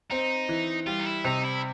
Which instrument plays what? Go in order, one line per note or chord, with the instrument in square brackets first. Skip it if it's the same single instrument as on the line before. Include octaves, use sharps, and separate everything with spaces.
[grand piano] C4 [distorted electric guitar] D#4
[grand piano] E3
[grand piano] G3 [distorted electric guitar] F4
[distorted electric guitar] D#4
E4
[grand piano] C3 [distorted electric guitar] D#4
[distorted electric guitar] E4